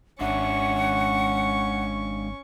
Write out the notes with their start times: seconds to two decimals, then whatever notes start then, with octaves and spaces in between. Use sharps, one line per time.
0.21 G#1 G#3 C#4 D4 E5 F#5 C#6